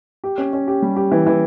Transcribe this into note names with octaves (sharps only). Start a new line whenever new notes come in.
G4
C#4
C#4
G4
G3
G4
E3
E3